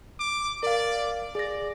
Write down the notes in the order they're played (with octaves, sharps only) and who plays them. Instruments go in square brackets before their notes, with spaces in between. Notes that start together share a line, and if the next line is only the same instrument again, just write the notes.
[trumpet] D6
[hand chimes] A#4 F5 [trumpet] D5
[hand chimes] G#4 A#6 [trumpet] D5